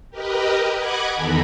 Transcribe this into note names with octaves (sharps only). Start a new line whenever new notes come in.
G4 A#4 B4 D#5
D#5 F#5 B5 D6 F#6 G#6
E2 D#3 A4 G#5 A#5 B5